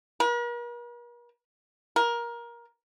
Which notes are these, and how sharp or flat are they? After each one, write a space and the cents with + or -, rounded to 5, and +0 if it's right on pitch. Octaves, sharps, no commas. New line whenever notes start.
A#4 +45
A#4 +20